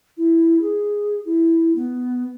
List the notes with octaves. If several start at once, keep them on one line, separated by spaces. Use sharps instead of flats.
E4
G#4
E4
B3